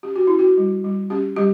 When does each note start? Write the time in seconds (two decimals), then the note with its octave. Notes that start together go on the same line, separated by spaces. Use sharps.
0.03 C#4 G4
0.16 F#4
0.27 C#4 E4
0.39 F#4
0.57 G3
0.84 G3
1.10 C#4 G4
1.36 G3 G4